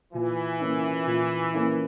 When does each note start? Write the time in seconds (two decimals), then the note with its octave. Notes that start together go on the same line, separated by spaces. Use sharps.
0.14 A#2 E3
0.60 A#3 C#4 E4
1.07 A#2
1.53 A#3 C#4 E4